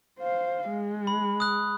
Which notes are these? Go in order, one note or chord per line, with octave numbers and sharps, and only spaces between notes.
C5 F5
G#3
B5
D#6 F#6